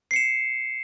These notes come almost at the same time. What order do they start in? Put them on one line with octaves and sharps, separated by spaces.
C7 C#7 E7